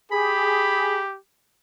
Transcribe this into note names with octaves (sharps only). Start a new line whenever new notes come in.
G4 G#4 B5